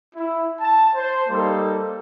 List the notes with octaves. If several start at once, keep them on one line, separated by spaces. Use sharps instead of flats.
E4
A5
C5
G3 A#3 D#4 A4